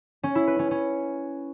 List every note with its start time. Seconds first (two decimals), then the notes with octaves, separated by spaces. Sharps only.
0.23 C#4
0.35 E4
0.47 B4
0.59 C#4
0.71 C#4